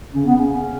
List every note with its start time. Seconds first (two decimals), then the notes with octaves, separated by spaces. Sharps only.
0.15 C#3 C#4
0.26 B3
0.35 C#3 C#4
0.54 C#3